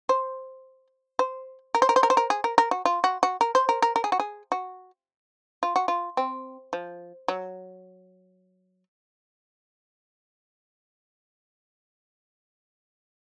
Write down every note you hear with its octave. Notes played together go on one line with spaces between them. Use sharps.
C5
C5
A#4
C5
A#4
C5
A#4
C5
A#4
G#4
A#4
A#4
F#4
F4
F#4
F#4
A#4
C5
A#4
A#4
A#4
G#4
F#4
G#4
F#4
F4
F#4
F4
C4
F3
F#3